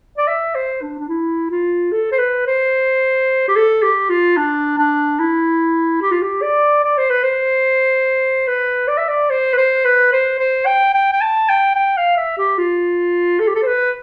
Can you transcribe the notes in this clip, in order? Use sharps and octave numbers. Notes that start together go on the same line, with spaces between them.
D5
E5
C5
D4
D4
E4
F4
A4
C5
B4
C5
G4
A4
G4
F4
D4
D4
E4
G4
F4
G4
D5
D5
C5
B4
C5
B4
D5
E5
D5
C5
B4
C5
B4
C5
C5
G5
G5
G5
A5
G5
G5
F5
E5
G4
F4
A4
G4
A4
C5
B4